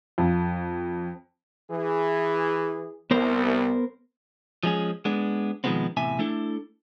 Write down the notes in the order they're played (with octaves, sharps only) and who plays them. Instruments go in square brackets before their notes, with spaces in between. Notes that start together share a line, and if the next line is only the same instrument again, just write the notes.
[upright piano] F2
[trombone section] E3 G#4
[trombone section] C2 [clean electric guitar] B3 A#4 C5
[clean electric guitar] F3 G#3 C#4 G#4
G#3 B3 D4
B2 D#3 F3 G#3 B3 C4
E2 A2 C3 E5 G#5
A3 D4 E4 A4